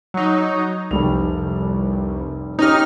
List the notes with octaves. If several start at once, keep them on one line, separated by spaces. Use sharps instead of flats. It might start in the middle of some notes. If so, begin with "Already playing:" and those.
F#3 D#4
F1 C2 G3 F7
C#4 D#4 G4 F6